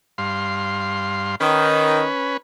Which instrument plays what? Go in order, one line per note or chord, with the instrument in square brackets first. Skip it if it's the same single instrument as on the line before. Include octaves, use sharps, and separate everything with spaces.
[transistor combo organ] G2 F5 C6
[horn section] D#3 [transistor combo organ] C#4 B4